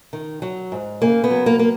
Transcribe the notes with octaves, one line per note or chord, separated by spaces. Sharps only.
D#3
F#3
G#2
C#3 A#3
B3
F#3
A#3
A#3